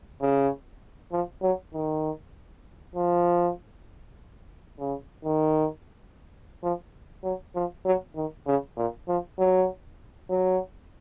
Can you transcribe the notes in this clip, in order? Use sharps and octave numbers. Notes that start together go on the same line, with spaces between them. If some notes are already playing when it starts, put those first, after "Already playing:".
C#3
F3
F#3
D#3
F3
C#3
D#3
F3
F#3
F3
F#3
D#3
C#3
A#2
F3
F#3
F#3